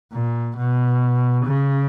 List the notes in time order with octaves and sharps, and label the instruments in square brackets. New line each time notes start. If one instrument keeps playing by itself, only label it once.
[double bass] A#2
B2
C#3